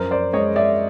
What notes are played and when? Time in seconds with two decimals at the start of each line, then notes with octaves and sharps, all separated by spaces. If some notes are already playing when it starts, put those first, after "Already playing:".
Already playing: F#2 F3 A#4 C5
0.11 C5 D5
0.33 G#3 C#5 D#5
0.56 D5 E5